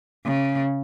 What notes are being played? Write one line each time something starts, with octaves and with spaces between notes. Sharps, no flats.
C#3